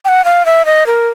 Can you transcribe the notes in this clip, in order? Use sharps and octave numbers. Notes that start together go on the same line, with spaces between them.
G5
F#5
F5
E5
D#5
A#4